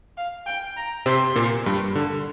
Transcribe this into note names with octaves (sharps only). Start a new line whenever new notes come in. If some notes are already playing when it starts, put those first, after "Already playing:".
F5
G5
A#5
C3 C4 C6
A#2 A#3
G2 G3
D3